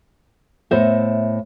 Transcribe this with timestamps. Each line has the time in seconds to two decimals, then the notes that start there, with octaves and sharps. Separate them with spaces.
0.71 A2 B3 C5 D#5 E5